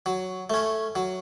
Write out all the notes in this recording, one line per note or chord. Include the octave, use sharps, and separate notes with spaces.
F#3
A3 C#4
F#3